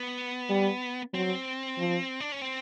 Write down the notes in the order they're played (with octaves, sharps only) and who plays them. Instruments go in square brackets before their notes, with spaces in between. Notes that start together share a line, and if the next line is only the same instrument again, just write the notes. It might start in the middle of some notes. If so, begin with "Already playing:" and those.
Already playing: [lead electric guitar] B3
[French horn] G3
[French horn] F#3 [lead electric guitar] C4
[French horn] F3
[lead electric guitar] D4
C#4
C4